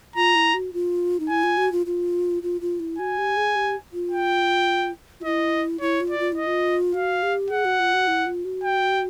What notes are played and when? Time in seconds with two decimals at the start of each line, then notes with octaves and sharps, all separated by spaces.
0.16 F4 A#5
0.35 E4
0.54 F#4
0.73 F4
1.20 D#4
1.29 E4 G#5
1.43 F4
1.57 F#4
1.72 F4
1.86 F4
2.43 F4
2.61 F4
2.80 E4
2.99 F#4 G#5
3.18 G4
3.37 G#4
3.56 G4
3.93 F4
4.12 G5
5.20 F4
5.24 E4 D#5
5.81 E4 C#5
6.00 F4
6.10 D5
6.19 F4
6.32 E4 D#5
6.46 F4
6.94 F#4 F5
7.23 G4
7.50 G#4 F#5
7.65 F#4
7.80 F4
7.94 F#4
8.08 E4
8.26 F4
8.45 F#4
8.64 G5